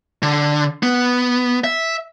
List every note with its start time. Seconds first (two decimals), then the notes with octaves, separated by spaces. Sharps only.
0.23 D3
0.83 B3
1.64 E5